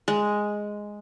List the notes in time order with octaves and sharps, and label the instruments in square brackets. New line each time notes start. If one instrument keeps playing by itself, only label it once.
[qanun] G#3